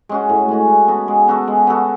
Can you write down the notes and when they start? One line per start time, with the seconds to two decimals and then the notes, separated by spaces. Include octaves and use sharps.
0.09 G#3 C#4 F#4
0.29 A2
0.49 G#3 C#4 F#4
0.68 G#3
0.88 B3 F#4 A4
1.08 G#3
1.28 B3 F#4 A4
1.47 G#3
1.67 B3 F#4 A4